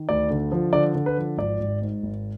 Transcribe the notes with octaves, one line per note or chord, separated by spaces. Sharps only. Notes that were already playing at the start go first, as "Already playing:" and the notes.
Already playing: D#3
D2 D5
D3
F3
D3 D5
D3
B4
F3
G#1 D5
G#1
G#2
G#1